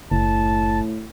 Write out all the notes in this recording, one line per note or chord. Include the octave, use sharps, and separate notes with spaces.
F#1 A2 A5